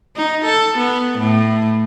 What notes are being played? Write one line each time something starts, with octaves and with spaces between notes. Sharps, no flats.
D#4
A4
B3
A2